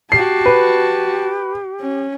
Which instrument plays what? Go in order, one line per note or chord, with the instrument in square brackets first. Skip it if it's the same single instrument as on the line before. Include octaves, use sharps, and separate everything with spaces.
[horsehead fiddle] F#4 A5 [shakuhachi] G4 [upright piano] C7
[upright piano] B4
[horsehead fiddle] C#4